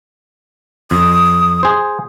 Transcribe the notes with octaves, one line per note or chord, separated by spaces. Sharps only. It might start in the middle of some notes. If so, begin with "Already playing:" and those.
F2 D#6
G#4 C5